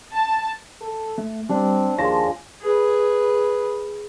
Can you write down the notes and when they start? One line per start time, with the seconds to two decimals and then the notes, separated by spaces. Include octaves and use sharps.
0.15 A5
0.81 A4
1.18 A3
1.50 G3 C4 D4
1.98 D#2 F3 G#3 C#5 A5 A#6
2.61 G#4 B4